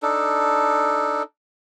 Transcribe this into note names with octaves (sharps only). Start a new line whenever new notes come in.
D4 D#4 A4